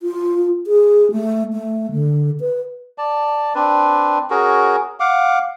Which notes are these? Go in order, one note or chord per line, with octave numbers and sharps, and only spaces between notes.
F4
G#4
A3
A3
D3
B4
D5 A5
C4 D4 B4
C#4 F#4 G#4 A#4
F5 F#5 D6